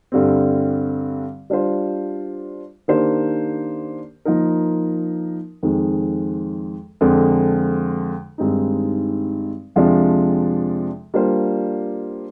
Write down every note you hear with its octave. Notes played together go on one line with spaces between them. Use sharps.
G2 D3 G3 C4
G3 D4 F4 C5
D#3 A#3 D4 G4 C5
F3 A#3 D#4 A#4
F2 D#3 G#3
F2 D3 G#3
G2 D#3 G#3 C4 D#4
F2 C3 F3 G#3 D4
G3 A#3 D4 F4 C5